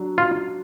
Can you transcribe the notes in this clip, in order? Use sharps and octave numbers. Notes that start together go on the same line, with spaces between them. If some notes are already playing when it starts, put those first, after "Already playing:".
Already playing: F#3 D4
F4